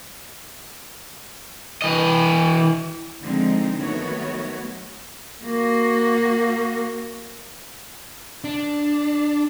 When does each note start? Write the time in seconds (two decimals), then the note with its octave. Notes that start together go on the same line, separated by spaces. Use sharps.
1.82 E3 D#5
3.22 D3 F3 G#3 C4 D#4
3.78 D#3 F#3 A3 B3 F#4 C#5
5.45 A#3 F#4
8.44 D4